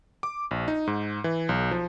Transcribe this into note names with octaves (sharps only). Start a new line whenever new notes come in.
D6
A#1
D#4
G#2
E3
B1
F3